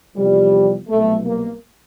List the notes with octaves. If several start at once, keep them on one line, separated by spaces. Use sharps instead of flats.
E2 C3 F3 G3
C2 B2 F#3 A3
A#3